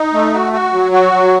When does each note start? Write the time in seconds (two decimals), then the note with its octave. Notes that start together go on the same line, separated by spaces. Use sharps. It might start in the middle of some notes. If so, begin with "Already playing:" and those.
Already playing: D#4
0.13 A3
0.34 F#4
0.53 F#4
0.73 F#3
0.92 F#4
1.12 F#3